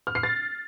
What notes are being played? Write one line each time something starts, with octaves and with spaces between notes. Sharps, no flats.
F6
C7
A6